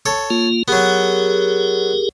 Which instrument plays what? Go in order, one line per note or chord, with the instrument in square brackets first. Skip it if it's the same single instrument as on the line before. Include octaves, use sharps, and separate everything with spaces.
[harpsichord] A4 C#5
[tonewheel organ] A#3 F4
[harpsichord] F#3 B3 [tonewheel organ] G4 G#4 A#4